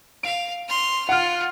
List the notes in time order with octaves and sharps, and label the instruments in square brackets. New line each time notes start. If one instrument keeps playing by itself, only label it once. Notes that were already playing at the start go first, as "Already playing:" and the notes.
[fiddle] F5 [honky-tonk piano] D7
[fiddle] C6 F6
[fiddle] F4 [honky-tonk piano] F#5 F6